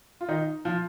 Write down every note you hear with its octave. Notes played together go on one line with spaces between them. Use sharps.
F4
D#3 D#4
F3 F4